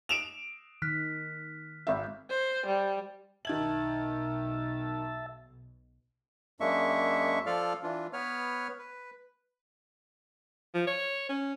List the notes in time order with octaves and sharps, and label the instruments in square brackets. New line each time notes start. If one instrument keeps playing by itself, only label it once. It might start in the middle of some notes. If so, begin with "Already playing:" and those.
[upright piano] D7 E7 F7
[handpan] D#3 [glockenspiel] F6 F#6 B6
[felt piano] G#1 E5
[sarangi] C5
G3
[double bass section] B1 B2 [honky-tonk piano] D#3 G#6 F#7 [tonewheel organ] E5 A5
[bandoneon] F#2 G#3 A#3 D4 E5 C#6
F3 F4 A4 D5 F5 F6
E3 D4 F4
B3 B4 C#5 F6
B4
[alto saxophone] F3
C#5
C#4